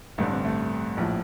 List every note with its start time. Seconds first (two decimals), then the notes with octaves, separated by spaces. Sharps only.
0.18 A1 G2 D3 A3
0.31 C4
0.45 A3
0.97 A#1 A2 F3